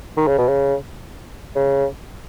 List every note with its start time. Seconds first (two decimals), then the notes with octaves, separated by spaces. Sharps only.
0.17 D#3
0.28 C#3
0.38 B2
0.49 C#3
1.56 C#3